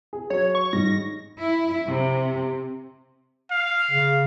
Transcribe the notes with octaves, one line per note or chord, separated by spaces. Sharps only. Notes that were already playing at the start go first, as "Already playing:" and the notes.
G#4
F#3 C#5
C#6
G#2 D#3 G3 A#6
E4
C3
F5
C#3